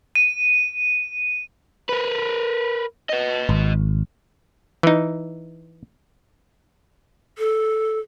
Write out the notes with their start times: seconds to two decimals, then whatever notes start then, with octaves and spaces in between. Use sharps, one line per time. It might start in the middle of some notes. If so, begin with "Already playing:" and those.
0.15 D#7
1.89 A#4 B4
3.09 B4 D#5
3.49 G#1
4.83 E3 D#4
7.38 A4